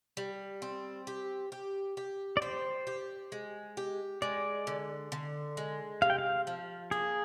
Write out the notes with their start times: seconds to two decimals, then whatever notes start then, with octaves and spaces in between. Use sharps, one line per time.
0.17 G3
0.62 C4
1.07 G4
1.52 G4
1.97 G4
2.37 D5
2.42 G4 C5
2.87 G4
3.32 G#3
3.77 G4
4.22 G#3 D5
4.67 D3
5.12 D3
5.57 G#3
6.02 C3 F5
6.10 G5
6.18 F5
6.47 F3
6.91 A#3 G#4